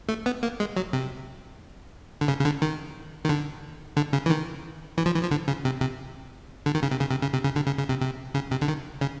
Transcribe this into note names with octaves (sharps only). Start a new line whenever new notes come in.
A3
B3
A#3
G#3
F#3
C3
D3
C#3
C#3
D3
D#3
D#3
D3
D3
C#3
E3
D#3
E3
F3
E3
F3
D3
C#3
C3
C3
D3
D#3
C#3
C3
C#3
C3
C#3
C3
C#3
D3
C#3
C#3
C3
C3
C#3
C3
D3
D#3
C#3